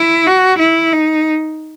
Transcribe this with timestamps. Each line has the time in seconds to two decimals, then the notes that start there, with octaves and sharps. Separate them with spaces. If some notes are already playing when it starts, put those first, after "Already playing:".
Already playing: E4
0.27 F#4
0.59 E4
0.92 D#4